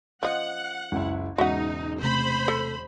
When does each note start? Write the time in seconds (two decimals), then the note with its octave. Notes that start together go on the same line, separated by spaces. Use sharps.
0.23 F3 C#4 D#5 F#5
0.92 F#1 C#2 E4
1.38 E1 G#2 C#3 D#4 F#4 E5 F#5
2.01 C3 A3 C5 B5
2.48 A4